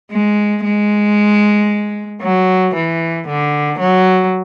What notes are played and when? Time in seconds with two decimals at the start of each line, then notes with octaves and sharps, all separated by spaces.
0.11 G#3
0.64 G#3
2.22 F#3
2.75 E3
3.28 D3
3.80 F#3